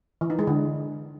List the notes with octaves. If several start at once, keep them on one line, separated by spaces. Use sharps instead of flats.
E3
D#4
G#3
D3